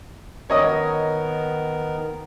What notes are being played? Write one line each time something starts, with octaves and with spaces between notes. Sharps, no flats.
D#3 B3 A#4 C#5 D#5 D#6